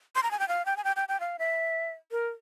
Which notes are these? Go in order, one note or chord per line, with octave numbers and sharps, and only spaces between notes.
C6
A#5
G#5
G5
F5
G5
G#5
G5
G5
G5
F5
E5
A#4